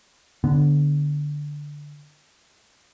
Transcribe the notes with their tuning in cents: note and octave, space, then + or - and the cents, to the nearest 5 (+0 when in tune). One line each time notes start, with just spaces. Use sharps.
D3 +0 B3 +0